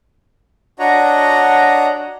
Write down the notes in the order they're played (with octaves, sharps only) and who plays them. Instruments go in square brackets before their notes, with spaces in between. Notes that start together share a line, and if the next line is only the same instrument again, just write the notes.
[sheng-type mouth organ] D4 F#4 C#5 D#5 F#5 A#5